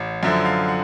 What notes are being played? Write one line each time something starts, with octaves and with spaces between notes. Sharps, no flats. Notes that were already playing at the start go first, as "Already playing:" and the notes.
Already playing: A1
F#2 D3 F3 E5
F5
F#5